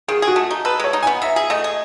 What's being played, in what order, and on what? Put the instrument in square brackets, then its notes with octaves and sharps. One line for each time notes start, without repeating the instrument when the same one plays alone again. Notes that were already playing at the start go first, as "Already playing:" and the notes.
[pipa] D#3 [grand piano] G#4
[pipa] G#4
[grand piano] F#4
[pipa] A3
D#4
[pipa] A4 [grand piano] B4
[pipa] G#3 [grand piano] C#5
[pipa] D#4
[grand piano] G#5
[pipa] B3
[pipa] D#4 [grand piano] E5
[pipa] G#4
[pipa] A3 [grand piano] D#5
[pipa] G#4